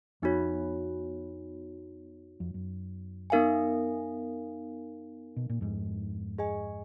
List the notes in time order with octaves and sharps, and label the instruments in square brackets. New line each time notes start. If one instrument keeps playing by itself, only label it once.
[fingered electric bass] F2 [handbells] B3 D#4 F#4 C#5
[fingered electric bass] F2
F#2
[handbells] B3 D#4 A#4 F5 G#5
[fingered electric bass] B2
A#2
F2 G#2
[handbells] G#4 D#5 G#5